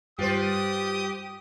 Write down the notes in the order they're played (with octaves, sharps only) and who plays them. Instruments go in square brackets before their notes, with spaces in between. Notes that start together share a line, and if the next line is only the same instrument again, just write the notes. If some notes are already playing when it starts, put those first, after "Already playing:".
[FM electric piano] G2 G3 [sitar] F4 B4 C5 [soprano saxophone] G4 [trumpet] D#6